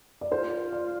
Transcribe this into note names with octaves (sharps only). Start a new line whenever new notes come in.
D5
F4 C5
D5